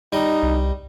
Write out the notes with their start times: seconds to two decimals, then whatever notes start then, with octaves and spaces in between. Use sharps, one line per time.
0.13 G3 D#4 D#5
0.43 C2